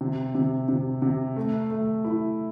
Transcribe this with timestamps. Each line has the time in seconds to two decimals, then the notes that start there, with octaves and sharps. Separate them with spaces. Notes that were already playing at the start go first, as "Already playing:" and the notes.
0.01 C3
0.35 C3
0.69 C3
1.02 C3
1.36 A3
1.70 A3
2.04 E4